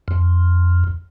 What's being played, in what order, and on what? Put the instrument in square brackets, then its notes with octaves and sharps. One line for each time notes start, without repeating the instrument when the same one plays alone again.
[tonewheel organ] F2